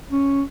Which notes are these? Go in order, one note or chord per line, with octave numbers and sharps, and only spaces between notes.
C#4